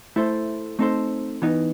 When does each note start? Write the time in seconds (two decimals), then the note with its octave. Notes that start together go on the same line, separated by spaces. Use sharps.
0.16 A3 E4 A4 C5
0.79 A3 C4 D#4 A4 C5
1.42 E3 B3 D#4